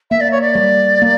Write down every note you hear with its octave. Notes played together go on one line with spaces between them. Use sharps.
A#3 E5
D5
C#5
D5
G3
A#3